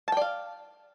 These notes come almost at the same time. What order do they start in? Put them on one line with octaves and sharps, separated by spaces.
A5 G5 D5 F5